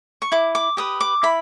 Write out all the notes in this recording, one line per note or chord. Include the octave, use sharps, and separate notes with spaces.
C#6
E4 D6
D6
G4 B4 D#6
D6
E4 B5